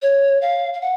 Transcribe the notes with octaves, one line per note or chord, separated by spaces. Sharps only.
C#5
F5
F5
F#5